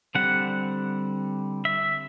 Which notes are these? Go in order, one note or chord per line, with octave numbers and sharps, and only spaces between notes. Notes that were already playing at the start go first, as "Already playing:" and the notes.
D3 G3 C4 F#5
E5